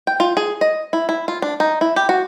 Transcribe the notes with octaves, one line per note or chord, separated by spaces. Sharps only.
G5
F4
G#4
D#5
E4
E4
F4
D4
D#4
E4
G4
F#4